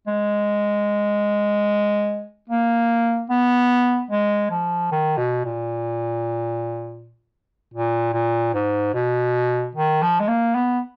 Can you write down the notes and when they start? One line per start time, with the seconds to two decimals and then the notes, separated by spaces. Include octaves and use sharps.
0.07 G#3
2.49 A#3
3.30 B3
4.11 G#3
4.51 F3
4.92 D#3
5.17 B2
5.45 A#2
7.74 A#2
8.13 A#2
8.54 G#2
8.94 B2
9.75 D#3
10.03 F3
10.20 G#3
10.28 A#3
10.55 B3